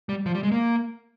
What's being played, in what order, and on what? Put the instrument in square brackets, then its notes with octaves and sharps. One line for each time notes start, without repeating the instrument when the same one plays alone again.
[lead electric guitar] G3
F3
G3
G#3
A#3